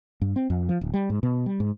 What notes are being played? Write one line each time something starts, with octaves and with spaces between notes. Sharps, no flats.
G2
C4
F2
F3
D1
G3
G#2
B2
G3
G#2